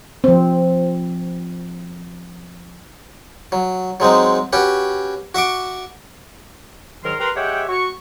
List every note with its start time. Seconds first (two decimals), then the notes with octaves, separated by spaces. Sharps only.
0.24 F3 C4
3.52 F#3
4.00 F#3 G#3 C4 D#4
4.53 C#4 F#4 G4 B4
5.34 F#4 E5 C#6 D6
7.04 G#2 D#3 F#3 A#4 C6 F6
7.20 G4 A#4 B4 A#5 C6
7.36 G#3 G4 C#5 E5 F#5 G5
7.69 F#4 C#6